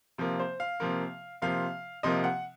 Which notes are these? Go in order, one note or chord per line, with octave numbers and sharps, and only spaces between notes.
C3 F3 A#3
C5
F5
C3 F3 A#3
C3 F3 A#3 F5
C3 F3 A#3 D#5
F#5